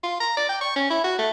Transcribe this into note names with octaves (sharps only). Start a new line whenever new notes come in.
F4
A#5
D5
G5
C#6
C#4
E4
F#4
A3